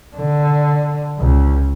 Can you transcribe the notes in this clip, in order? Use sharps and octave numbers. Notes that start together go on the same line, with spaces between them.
D3
C#2